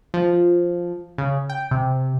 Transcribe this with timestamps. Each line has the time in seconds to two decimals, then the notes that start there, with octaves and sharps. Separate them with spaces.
0.14 F3
1.18 C#3
1.50 G5
1.71 C3